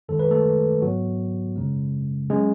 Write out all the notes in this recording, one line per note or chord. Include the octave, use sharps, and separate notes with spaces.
F#2 D#3 G#3 A4
B4
A3 A4
G#2 F#3 B3 F#4
F#2 C#3 G#3
F#3 G#3 C#4 G#4